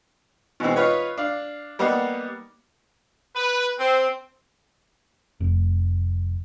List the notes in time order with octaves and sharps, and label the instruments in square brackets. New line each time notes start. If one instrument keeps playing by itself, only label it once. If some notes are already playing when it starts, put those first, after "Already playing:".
[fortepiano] B2 E3 G#3 C4
D#4 F4 B4 C#5
D4 F5
G3 A#3 B3 D#4 F#5
[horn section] B4
C4
[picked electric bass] F1